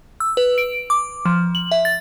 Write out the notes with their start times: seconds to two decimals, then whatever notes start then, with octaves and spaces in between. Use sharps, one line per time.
0.20 E6
0.37 B4
0.58 D7
0.90 D6
1.26 F3
1.55 F#7
1.72 E5
1.85 A6